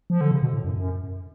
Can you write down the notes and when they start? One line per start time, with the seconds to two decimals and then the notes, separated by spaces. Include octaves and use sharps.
0.10 F3
0.21 D3
0.31 C#3
0.42 B2
0.54 A2
0.64 F#2
0.76 F#2